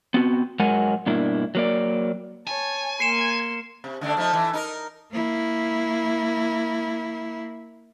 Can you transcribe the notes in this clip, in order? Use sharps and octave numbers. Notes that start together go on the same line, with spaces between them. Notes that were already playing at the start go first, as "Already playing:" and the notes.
B3 C4 F#4
G#2 F#3 G#3 A#4 F#5 G#5
G2 B2 A#3 D4 E4
F#3 A#3 D5
C#5 G#5 A5
A#3 C6 C7 C#7 E7
C3
D3 A3 D4
F3 A3 D#4
E3 A3
D#4 A#4
A#3 E4